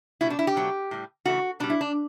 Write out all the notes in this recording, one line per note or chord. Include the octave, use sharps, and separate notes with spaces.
B2 G3 E4
D4
E4
G4
B2 F#3 A3
A2 G3
C#3 E3 A3 F#4
B2 G3 D4
E4
D4